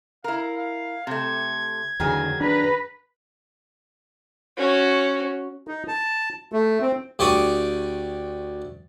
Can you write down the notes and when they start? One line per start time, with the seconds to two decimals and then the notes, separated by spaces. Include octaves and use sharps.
0.24 E4 A#4 F5
0.57 F5
1.07 C3 A3 G#6
2.00 E2 D3 D#3 F#3 G#4
2.40 D4 B4 A#5
4.57 C#4 F#4
5.68 D#4
5.88 A5
6.52 A3
6.81 C4
7.19 D2 G4 D5 G5 C#6 D#6